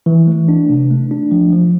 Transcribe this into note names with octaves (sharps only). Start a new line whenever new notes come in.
E3
A3
D4
C3
A3
D4
F3
F3